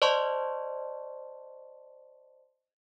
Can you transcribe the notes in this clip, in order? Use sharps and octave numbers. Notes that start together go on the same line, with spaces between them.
C5 D5 D#5 A5 C6 C#6